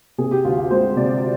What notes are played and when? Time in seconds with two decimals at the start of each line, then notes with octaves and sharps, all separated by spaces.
0.18 C3 G#4
0.31 G4
0.45 D2 F4
0.57 F4
0.71 G#3 C5
0.97 C3 D5